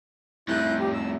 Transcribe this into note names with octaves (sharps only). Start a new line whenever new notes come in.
F2 A2 E4 F#6 G6
G4
E6